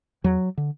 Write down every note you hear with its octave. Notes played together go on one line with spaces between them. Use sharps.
E2 F#3
D3